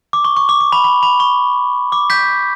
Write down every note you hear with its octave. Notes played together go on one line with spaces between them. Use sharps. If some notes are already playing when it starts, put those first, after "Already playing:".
D6
C#6
C#6
D6
D6
B5
B5
B5
C#6
D6
G6 B6